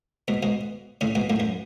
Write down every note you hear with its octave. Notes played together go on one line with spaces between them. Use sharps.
G#2 B2
G#2 B2
A2 C#3
G#2 B2
F#2 A2
F#2